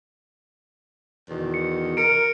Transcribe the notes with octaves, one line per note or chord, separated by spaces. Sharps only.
E2 B2 D#3
C#7
A#4 C#7 D7